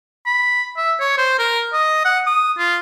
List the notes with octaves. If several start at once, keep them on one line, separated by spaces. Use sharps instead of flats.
B5
E5
C#5
C5
A#4
D#5
F#5
D#6
F4